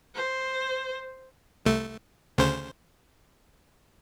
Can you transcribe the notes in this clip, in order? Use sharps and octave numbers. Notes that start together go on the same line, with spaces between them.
C5
C2 A3
D2 C#3 C5